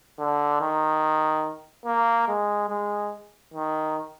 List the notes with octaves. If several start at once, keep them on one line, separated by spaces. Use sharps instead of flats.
D3
D#3
A#3
G#3
G#3
D#3